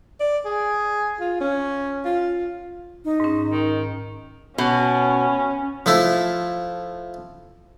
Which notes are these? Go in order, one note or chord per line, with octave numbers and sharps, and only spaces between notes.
D5
G#4
F4
C#4
F4
D#4
G#2 C#4
D#3
B2 C#4
F3 A3 E4